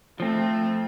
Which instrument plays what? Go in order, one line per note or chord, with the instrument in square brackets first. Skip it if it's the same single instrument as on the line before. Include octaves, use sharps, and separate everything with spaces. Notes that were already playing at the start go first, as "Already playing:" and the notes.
[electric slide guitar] F3 C4 [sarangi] A3